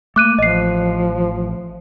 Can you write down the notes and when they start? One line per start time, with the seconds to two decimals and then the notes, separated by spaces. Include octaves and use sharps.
0.16 A3 A#3 D6 F#6 D#7
0.39 A1 F3 D#5 C7